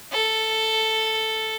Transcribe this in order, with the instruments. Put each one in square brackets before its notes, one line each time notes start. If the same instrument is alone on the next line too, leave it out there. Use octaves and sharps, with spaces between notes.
[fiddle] A4